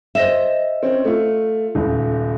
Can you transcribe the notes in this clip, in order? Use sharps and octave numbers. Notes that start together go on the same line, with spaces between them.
C5 D#5 E5
C4 C#4
A3 F4
D#1 C#2